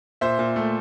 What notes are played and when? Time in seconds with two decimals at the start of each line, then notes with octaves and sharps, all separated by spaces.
0.21 A#2 C5 E5
0.39 A#2
0.56 A3